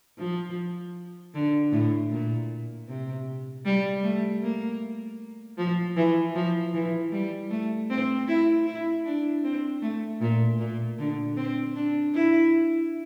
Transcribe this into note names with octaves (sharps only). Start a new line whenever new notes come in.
F3
D3
A2
A#2
C3
G3
A3
A#3
F3
E3
F3
E3
G3
A3
C4
E4
E4
D4
C4
A3
A#2
A#2
D3
C4
D4
E4